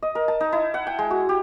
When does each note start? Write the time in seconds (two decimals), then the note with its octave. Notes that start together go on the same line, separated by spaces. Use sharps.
0.03 D#5
0.15 A#4
0.28 A5
0.41 D#4
0.53 E4
0.74 F#5
0.87 G5
0.99 G#3
1.11 F#4
1.29 G4